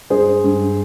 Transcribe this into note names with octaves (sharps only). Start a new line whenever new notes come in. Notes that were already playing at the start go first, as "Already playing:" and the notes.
G2 G#4 C5
G2